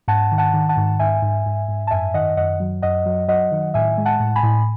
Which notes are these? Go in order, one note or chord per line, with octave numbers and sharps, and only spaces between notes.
G#2 F#5 A5
D#3
F#5 A5
D#3
F#5 A5
G#2
G#2 E5 G#5
G#2
G#2
G#2
A5
F#2 E5 G#5
D#3 D#5 F#5
F#2 D#5 F#5
F#3
F#2 D#5 F#5
F#3
F#3 D#5 F#5
D#3
A2 E5 G#5
G#3
F#5 A5
A2
G#5 B5
A2